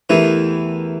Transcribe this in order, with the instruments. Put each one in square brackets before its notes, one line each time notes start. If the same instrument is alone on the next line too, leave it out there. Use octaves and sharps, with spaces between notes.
[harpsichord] E2 E3 [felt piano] A3 E4 G4 A#4